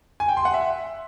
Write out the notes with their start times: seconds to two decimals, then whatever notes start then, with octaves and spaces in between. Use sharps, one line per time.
0.20 G#5
0.28 G5
0.37 C6
0.45 F#5
0.54 E5